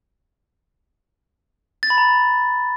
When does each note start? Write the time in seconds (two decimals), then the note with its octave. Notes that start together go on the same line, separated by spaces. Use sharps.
1.83 A6
1.90 B5
1.98 A#5